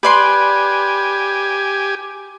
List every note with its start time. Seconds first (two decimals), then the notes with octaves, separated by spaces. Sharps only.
0.03 G4 B4 D5 G#5 C6